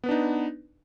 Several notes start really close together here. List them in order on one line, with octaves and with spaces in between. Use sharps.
B3 B4 D4 D#4